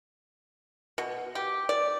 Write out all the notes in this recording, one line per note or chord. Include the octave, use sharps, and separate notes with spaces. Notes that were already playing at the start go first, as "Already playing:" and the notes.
B2
G4
D5